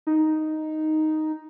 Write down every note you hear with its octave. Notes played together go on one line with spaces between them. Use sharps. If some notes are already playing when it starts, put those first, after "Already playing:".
D#4